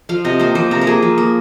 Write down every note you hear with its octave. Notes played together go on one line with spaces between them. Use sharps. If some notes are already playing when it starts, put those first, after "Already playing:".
F3 F5
C3 D#5
A#3 C5
F3 C5
C3 A#4
A#4
A#3 G#4
F3
A#3